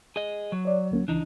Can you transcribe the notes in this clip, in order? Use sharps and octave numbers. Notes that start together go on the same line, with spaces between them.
G#4 D#5
F#3
C#5 D5
D2 A#3 C#4
C#2 E3 D4 D#4